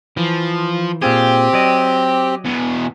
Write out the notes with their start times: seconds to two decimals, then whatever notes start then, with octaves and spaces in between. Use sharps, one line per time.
0.17 E3 F3
1.02 A#2 C4 F4 G4 G#4
1.53 F#3 D5 D#5
2.45 E2 B2